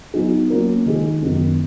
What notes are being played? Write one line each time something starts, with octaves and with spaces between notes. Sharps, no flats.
F#3 B3 D#4 G#4
F#3 A#3 C#4 F#4 A#4
D#3 G#3 D#4 G#4
F#2 D#3 G#3 B3